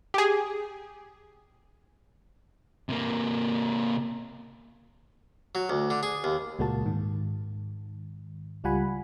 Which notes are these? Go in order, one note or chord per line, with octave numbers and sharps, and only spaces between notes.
G4 G#4
C3 A#3
F#3
D2
D3
G#4
D#2
C#2 A#2 G#3 A#3 F#4 A5
G#2 D#3
C#2 G3 F4 F#5 G#5 B5